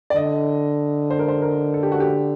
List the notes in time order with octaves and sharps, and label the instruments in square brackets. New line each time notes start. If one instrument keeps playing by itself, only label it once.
[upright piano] D5
[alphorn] D3 [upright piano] D#5
[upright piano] C5
A#4
C5
A#4
A4
G4
F#4
G4